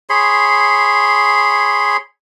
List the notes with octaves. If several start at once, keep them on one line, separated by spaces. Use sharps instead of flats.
G#4 C#5 B5 C6